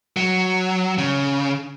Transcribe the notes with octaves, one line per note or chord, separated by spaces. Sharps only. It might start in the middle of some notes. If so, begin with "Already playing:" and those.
F#3
C#3